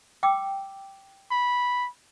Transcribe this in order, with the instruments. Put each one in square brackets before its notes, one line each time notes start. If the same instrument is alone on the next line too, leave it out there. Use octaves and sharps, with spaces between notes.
[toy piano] G5 D6 E6
[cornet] B5